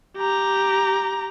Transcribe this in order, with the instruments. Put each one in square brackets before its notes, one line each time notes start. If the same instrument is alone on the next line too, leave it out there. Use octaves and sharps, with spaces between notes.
[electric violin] G4 A#5